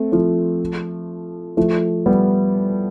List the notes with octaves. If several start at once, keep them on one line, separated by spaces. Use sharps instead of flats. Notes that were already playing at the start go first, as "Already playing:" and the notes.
Already playing: A3 C4
F3 A3
F3 A3
G3 B3